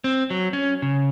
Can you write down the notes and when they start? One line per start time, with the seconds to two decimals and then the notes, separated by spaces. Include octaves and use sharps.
0.04 C4
0.30 F#3
0.53 C#4
0.82 C#3